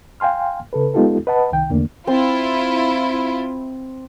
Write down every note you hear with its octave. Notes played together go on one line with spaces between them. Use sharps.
F5 G5 G#5 C6 F6
C#3 A4 B4
G#3 B3 D#4 F4 G4 A4
B4 D#5 F#5 A5 B5
C2 D#3 G5
E2 D3 A3 A#3 D4
C4 E4 F4